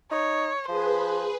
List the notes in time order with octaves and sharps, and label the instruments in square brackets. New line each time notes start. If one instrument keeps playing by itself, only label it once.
[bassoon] D#4 [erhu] C#5
[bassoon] F3 [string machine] G#4 B4 [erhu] C5